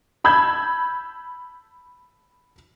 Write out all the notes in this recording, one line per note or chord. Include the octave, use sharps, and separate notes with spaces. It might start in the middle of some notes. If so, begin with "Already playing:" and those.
A5 B5 E6 G6 G#6